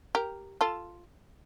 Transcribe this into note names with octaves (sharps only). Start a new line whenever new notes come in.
G4 A#4
F4 A4